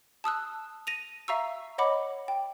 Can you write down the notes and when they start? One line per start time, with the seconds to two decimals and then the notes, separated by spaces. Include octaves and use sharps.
0.24 A5 D#6 E6 F#6
0.87 A#6 D#7 F7
1.28 E5 F5 A#5 C#6 E6
1.78 C#5 D#5 F#5 B5 D6
2.28 G5